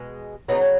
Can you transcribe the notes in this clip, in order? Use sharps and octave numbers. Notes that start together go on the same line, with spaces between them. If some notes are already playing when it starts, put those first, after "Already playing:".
Already playing: B2 G#3
C#3 F#3 B3 D#4
C#4